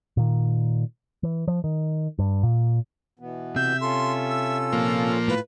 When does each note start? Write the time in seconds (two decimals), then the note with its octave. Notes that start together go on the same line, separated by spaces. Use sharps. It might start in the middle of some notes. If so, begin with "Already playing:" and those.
0.17 A#2 D#3
1.23 E3
1.48 F3
1.64 D#3
2.19 G2
2.43 A#2
3.19 B2 E3 B3
3.56 C3 E5 G6
3.81 C#4 F4 A4 C6
4.29 E6
4.72 A#2 F3 A#3
5.28 A2 F4 B4